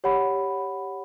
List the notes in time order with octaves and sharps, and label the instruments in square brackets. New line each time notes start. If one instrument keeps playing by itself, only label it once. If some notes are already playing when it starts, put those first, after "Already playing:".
[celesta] G4 C#5 F#5 B5